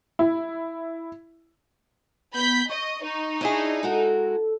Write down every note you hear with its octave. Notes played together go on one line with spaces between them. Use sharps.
E4
B3 B5 G6 B6
D#5 C#6
D#4
D4 E4 G#4
G#3 F#4 A4 A#4